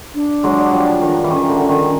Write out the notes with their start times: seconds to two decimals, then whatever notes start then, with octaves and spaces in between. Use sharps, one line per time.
0.15 D4
0.44 F#3 G#3
0.72 F3 G3
1.02 D#3
1.24 E3
1.30 D#3 C#4
1.49 D3
1.69 D#3